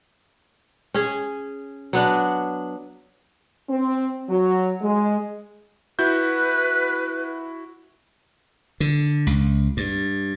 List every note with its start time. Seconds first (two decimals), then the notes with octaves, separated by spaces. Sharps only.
0.94 C#4 G#4
1.93 F#3 B3 D4
3.69 C4
4.29 F#3
4.81 G#3
5.99 E4 F#4 B4 G6
8.80 D3
9.27 C#2
9.77 G2